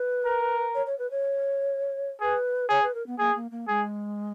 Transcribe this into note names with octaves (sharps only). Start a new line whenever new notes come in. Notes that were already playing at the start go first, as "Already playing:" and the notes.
Already playing: B4
A#4
C#5
C#5
B4
C#5
G#4 B4
G#4 C#5
B4
A#4
B3
A#3 G#4
A#3
A#3
G#3 G#4